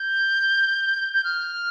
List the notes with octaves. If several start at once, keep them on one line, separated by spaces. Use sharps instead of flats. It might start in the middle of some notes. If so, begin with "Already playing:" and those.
Already playing: G6
G6
F6